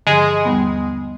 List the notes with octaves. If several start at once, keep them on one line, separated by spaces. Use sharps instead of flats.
G2 D3 F3 G#3 G#4
D#2 G3 B3